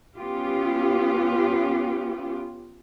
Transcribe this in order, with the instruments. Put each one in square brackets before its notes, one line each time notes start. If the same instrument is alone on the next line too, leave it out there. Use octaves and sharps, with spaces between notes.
[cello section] B3 C#4 F4 G4